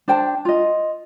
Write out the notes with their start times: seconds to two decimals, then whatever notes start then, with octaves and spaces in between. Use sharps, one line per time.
0.08 D4 C5 G5 A5
0.45 F4 D#5